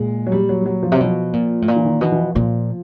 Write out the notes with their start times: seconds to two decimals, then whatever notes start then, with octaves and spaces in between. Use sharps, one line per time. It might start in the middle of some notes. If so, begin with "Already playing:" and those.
Already playing: A#2 G#3
0.27 F#3
0.32 G3
0.49 F#3
0.61 G3
0.66 F#3
0.83 F3
0.92 C3 F#3
1.00 B2 F3
1.33 A#2
1.62 A2
1.68 A#2
1.76 E3
1.85 D#3
2.01 B2 E3
2.12 E3
2.19 F3
2.35 A#2 F3